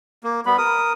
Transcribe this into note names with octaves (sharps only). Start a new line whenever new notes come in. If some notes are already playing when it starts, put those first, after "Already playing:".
A#3
G3 B3 B5
A#4 D#6